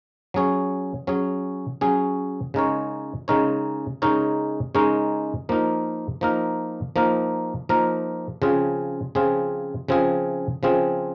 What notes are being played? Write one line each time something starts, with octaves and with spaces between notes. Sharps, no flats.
F#3 C#4 G#4 C#5
F#3 C#4 G#4 C#5
F#3 C#4 G#4 C#5
C#3 G#3 D#4 A#4 C#5
C#3 G#3 D#4 A#4 C#5
C#3 G#3 D#4 A#4 C#5
C#3 G#3 D#4 A#4 C#5
F3 A#3 D#4 A#4
F3 A#3 D#4 A#4
F3 A#3 D#4 A#4
F3 A#3 D#4 A#4
C#3 F3 C4 F4 G#4
C#3 F3 C4 F4 G#4
C#3 F3 C4 F4 G#4
C#3 F3 C4 F4 G#4